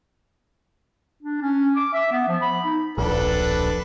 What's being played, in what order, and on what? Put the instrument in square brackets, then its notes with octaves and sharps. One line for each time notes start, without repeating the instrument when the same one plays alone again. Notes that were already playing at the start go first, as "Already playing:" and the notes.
[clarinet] D4
C#4
D6
E5
B3
F3
B5
D#4
[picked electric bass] D1 A#1 [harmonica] D4 A4 B4